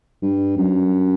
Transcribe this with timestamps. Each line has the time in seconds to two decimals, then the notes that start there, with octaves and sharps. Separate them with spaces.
0.22 G2
0.57 F#2